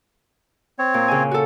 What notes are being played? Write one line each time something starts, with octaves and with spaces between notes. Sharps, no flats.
C4 C#5
A#2
C#3 G#5
F#4 A4